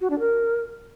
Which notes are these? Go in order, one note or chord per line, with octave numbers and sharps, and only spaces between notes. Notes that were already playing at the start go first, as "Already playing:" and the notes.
F#4
D4
A#4